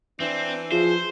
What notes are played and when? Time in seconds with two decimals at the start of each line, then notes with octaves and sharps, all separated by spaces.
0.20 E3 C4 D4
0.72 F3 G#4 C5